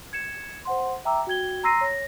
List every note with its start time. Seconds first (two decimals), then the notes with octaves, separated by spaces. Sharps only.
0.13 G#6 C#7 E7
0.65 C5 F#5 C6
1.05 E5 G5 A#5 D6 E6
1.27 F#4 G5 G#6 G7
1.64 A#5 C6 E6 A#6 C7 D#7
1.81 C#5 A#6